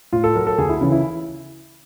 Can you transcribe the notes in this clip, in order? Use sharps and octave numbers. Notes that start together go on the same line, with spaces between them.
A2 F4
A4
F#3 A#4
A4
D2 G#4
E4
C#3 E3
E4